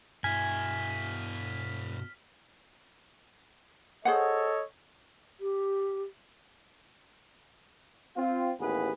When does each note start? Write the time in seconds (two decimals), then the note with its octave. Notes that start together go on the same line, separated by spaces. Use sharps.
0.24 G2 B2 E4 G#5 F6 B6
4.05 G#4 A4 C5 C#5 D#5 F#5
5.40 G4
8.17 C4 F4
8.60 A1 D#2 E3 B3 G#4 B4